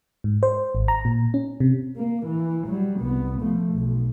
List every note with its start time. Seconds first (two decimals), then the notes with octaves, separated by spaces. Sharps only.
0.24 G#2
0.43 C5
0.75 G#1
0.88 A#5
1.05 A#2
1.34 C#4
1.60 C3
1.97 A#3
2.26 E3
2.67 F#3 G3
3.00 C2 B3
3.41 F3 A3
3.73 B1